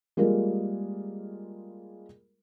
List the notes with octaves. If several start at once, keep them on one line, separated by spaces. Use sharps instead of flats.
G3 G#3 A#3 F4 G#4 A#4